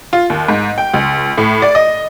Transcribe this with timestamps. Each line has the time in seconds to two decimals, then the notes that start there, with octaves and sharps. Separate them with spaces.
0.13 F4
0.30 D#2
0.48 G#2
0.78 G5
0.94 C#2
1.38 A2
1.62 D5
1.75 D#5